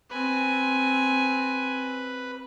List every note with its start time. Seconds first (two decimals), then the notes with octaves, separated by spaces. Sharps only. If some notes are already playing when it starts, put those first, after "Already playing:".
0.11 C4 B4 G#5